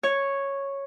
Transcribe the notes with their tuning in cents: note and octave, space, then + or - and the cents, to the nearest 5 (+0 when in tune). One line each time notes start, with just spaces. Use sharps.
C#5 -5